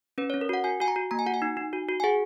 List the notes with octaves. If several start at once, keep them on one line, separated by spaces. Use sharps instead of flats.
C#4 B4
C#4 C#5
A#4
F#4 F#5
F#4 G#5
F#4 G#5
A#5
F#4
A#3 A#5
G#5
F#4 F#5
G#5
D#4
D#4
F#4
F#4
G#5
G#4 F#5